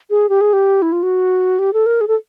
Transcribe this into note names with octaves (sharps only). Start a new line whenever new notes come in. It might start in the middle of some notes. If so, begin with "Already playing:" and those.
G#4
G4
G#4
G4
E4
F4
F#4
G4
A4
A#4
G#4
A4